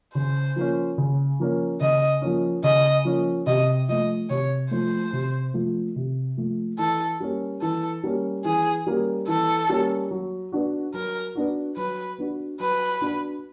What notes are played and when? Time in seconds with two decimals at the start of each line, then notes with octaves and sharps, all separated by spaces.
0.15 C#3 C5
0.56 F3 A#3 C#4
0.98 C#3
1.39 F3 A#3 C#4
1.81 C#3 D#5
2.22 F3 A#3 C#4
2.64 C#3 D#5
3.05 F3 A#3 C#4
3.47 C3 D#5
3.88 F3 A3 D#5
4.29 C3 C#5
4.71 F3 A3 C5
5.13 C3
5.54 F3 A3
5.96 C3
6.37 F3 A3
6.79 E3 A4
7.20 G3 A#3 C#4
7.61 E3 A4
8.03 G3 A#3 C#4
8.45 E3 G#4
8.86 G3 A#3 C#4
9.28 E3 A4
9.69 G3 A#3 C#4
10.11 F#3
10.52 B3 D4 F#4
10.94 F#3 A#4
11.35 B3 D4 F#4
11.77 F#3 B4
12.18 B3 D4 F#4
12.60 F#3 B4
13.01 B3 D4 F#4